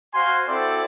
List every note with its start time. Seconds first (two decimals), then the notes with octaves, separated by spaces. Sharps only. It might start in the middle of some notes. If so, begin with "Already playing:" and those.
0.14 F#4 C5 F5 G#5 C6
0.48 C4 E4 F#4 A4 C5 D5